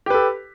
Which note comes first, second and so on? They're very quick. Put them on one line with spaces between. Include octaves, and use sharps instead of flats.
G4 B4 A4